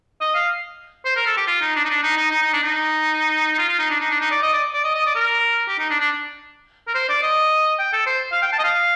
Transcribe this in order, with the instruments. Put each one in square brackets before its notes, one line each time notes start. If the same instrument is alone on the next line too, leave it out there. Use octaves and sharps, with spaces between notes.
[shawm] D#5
F5
C5
A#4
A4
G4
F4
D#4
D4
D#4
D4
D#4
D#4
D#4
D#4
D4
D#4
D#4
F4
F4
D#4
D4
D#4
D4
D#4
D5
D#5
D5
D5
D#5
D#5
D5
A#4
G4
D#4
D4
D4
A#4
C5
D5
D#5
G5
A4
C5
F5
G5
A5
D#5
F5